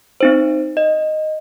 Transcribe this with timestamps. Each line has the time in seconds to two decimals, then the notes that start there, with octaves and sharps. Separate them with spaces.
0.21 C4 D#4 C5
0.77 D#5